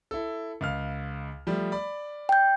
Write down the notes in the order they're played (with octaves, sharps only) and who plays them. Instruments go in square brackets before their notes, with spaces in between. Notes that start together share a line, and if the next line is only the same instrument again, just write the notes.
[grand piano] E4 A4
C#2 F5 F6
F3 G3 A3
D5 B5
[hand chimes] G5 G6